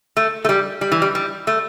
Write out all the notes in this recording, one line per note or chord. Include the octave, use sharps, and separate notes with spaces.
A3
A3
G3
G3
E3
G3
G3
A3